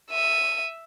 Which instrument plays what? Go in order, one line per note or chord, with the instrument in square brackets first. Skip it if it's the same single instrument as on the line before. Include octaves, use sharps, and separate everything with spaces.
[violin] E5 D#7